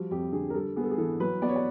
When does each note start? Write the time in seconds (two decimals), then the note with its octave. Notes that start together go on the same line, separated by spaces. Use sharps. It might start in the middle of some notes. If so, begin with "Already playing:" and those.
Already playing: F3 G3 F#4
0.11 F2 G4
0.33 D3 G#4
0.50 A#4
0.54 G3 A4
0.76 B3 G#4
0.83 A4
0.91 G#4
0.98 E3 A4
1.20 F#3 B4
1.42 B3 D5
1.49 C#5
1.56 D5